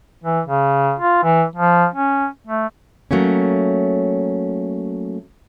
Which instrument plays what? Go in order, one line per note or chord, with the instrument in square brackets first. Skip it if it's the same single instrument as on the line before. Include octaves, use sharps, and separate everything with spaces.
[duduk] E3
C#3
F4
E3
F3
C#4
A3
[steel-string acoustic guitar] F#3 A3 A#3 C#4